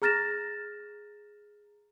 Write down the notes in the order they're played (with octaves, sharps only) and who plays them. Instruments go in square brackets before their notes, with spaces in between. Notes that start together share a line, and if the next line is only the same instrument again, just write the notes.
[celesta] G#4 A#5 F6 A6 A#6 E7